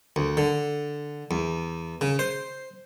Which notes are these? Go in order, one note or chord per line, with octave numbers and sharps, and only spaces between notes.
D2
D3
E2
C#3
C5